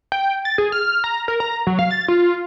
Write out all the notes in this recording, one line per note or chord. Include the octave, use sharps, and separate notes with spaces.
G5
A6
G#4
F6
F6
A#5
A#4
A#5
F#3
F5
A6
F4